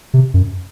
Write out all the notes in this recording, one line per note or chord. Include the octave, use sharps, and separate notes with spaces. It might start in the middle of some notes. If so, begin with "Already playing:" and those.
C3
F#2